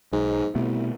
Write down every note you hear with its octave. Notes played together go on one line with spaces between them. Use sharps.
B1 G#2
C2 B2 A3 B3